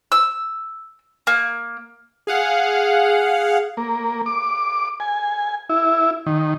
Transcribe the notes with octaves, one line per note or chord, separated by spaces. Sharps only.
E6
A#3
G#4 F5 F#5
A#3
D6
G#5
E4
D#3